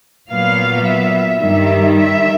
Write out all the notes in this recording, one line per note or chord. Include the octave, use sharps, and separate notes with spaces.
A#2 F#3 B3 F5
E5
G2 D#3 G3 E5
E5